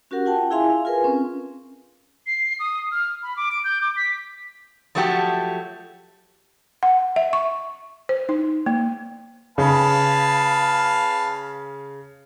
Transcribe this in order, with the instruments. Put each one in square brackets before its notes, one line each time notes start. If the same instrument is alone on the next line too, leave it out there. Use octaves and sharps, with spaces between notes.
[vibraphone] C#4 F#4 G4 A#4 F#5
F4 F#5 G5 A5
E4 G#4 E5 F5 G#5 C6
F5
F4 G#4 A#4 B4 G#5
C4 C#4
[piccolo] C7
D#6
F6
B5
D6
D7
G6
D6
B6
[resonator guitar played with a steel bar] F3 F#3 A3 F#4 G4 A4
[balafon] F#5
E5
C#6
C5
D#4
A#3
[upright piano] C#3 [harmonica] B4 F5 A5